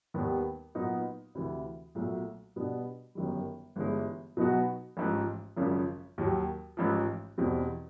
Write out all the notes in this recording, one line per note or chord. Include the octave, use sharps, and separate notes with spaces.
D#2 D#3 G3 B3
A#2 F#3 B3 D#4 F#4
D2 C3 E3
B1 A#2 F#3 A3
B2 G3 B3 D4
G1 F#2 D#3 G3
G1 G2 E3 G#3
B2 F#3 B3 D#4 F#4
A1 G#2 F3
G#1 F#2 C#3 F3
D#2 D#3 F#3
A1 G#2 F3
E2 B2 G3 C4